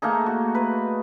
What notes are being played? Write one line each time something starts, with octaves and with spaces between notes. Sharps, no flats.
A3 A#3 D#4 G#4
F#4
B4